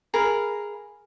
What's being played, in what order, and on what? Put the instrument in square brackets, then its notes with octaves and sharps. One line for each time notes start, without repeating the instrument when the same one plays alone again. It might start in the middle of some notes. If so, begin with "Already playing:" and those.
[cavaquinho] G#4 A#4 F5 B5